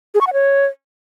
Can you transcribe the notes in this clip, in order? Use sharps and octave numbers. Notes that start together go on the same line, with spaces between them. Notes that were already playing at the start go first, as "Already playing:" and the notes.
G#4
C#6
F#5
C#5